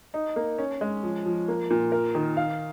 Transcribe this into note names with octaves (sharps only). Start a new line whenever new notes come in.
D#4
A#3
C#4
G#3
F3
F3
A#3
A#2
A#4
D#3
F5